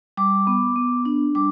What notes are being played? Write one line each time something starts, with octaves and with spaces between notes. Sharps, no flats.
G3 D6
B3
B3
D4
G3 D6